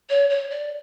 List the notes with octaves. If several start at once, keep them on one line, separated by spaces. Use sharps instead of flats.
C#5
C#5
D5